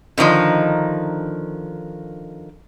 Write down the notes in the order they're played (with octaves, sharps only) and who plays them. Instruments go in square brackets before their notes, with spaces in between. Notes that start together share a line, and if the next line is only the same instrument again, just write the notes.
[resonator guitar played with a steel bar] D3 D#3 F3 D#4